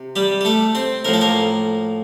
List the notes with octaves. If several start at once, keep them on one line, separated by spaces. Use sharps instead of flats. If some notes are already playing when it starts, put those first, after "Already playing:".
Already playing: C3
G3 G4
G4
A3 A4
C4 C5
A2 F3 A#4
A4
A#3 A#4